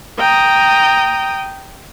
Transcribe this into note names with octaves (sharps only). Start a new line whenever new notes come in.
G5 A#5 D#6